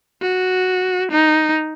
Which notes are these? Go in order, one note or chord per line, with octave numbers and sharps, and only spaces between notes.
F#4
D#4